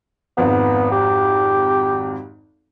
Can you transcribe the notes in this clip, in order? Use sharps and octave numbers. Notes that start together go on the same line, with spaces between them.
G#1 F2 G#2 B3
G4